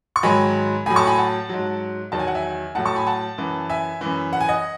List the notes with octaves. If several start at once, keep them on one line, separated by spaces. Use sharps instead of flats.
C#6
G#2 D#3 F#3 G#5 B5
A2 F#3 G#5 B5
A5 C#6
G#5 B5
F#5 A5
G#2 F#3
E2 D#3 F#3 A5
G#5
F#5
E5 G#5
A2 F#3 F#5 A5
A5 C#6
G#5 B5
F#5 A5
F#2 E3
E5 G#5
F#2 E3
F#5
G#5
D#5 F#5